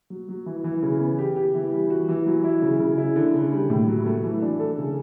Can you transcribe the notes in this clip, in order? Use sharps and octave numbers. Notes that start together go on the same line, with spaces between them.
F#3
F#3
E3
E3
C#3
B3
G4
G4
E3
G3
F#4
E3
F#3
E4
C#3
C#3
E4
D3
C#3
G3
A2
F#3
A3
E3
D4
A4
C#3